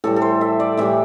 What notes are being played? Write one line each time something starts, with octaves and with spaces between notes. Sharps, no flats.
A2 E3 G3 A4
A4
C5
E5
D5
A2 E3 G3 E5